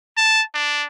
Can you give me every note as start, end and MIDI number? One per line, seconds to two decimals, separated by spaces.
0.17 0.42 81
0.54 0.87 62